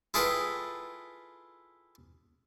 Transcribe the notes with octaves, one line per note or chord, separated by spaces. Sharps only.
E4 F4 G#4 A4 B4 G5